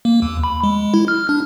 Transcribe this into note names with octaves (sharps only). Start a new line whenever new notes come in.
A#3
D#2
B5
G#3
E4
F6
D4